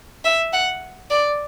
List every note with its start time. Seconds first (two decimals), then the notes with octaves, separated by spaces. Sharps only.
0.25 E5
0.53 F#5
1.10 D5